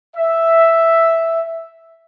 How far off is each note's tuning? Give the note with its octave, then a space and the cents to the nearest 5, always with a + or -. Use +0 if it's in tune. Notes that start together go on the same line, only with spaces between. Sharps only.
E5 +0